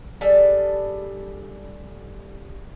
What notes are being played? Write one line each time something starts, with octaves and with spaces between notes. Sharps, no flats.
G3 D4 G#4 A4